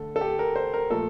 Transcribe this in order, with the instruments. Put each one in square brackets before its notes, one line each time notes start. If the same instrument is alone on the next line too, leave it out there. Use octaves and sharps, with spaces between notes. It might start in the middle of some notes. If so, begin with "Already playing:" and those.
Already playing: [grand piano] D3 A3 A4
A4
G4
A#4
C5
A#4
A#2 F3 A3 A4